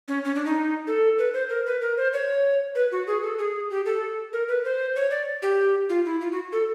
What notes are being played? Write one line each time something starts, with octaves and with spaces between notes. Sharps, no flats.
C#4
C#4
D4
D#4
A4
B4
C5
A#4
B4
A#4
C5
C#5
B4
F#4
G#4
A4
G#4
G4
A4
A#4
B4
C5
C#5
D5
G4
F4
E4
F4
F#4
A4